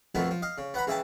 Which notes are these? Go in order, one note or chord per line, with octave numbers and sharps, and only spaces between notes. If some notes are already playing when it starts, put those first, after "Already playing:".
F2 B2 D#3 F3 A3 B3
F3
D#5 F5
C#3
B3 F#5 A#5 B5
C#3 E3 E5 G5 A5